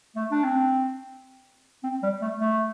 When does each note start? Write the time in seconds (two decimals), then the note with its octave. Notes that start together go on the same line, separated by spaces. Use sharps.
0.16 A3
0.31 D4
0.43 C4
1.83 C4
2.03 G3
2.21 A3
2.40 A3